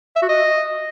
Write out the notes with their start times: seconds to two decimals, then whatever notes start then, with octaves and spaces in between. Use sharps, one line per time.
0.16 E5
0.22 F#4
0.29 D#5